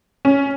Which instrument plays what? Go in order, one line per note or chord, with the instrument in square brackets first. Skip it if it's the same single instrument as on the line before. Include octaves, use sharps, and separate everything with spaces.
[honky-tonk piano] C#4